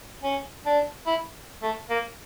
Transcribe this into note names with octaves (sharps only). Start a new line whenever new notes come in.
C#4
D4
E4
A3
A#3